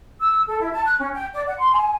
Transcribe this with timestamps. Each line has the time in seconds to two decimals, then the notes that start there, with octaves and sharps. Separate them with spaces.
0.20 E6
0.46 A4
0.58 E4
0.73 A5
0.86 F#6
0.98 C#4
1.13 G5
1.32 D5
1.46 F#5
1.58 C6
1.72 G#5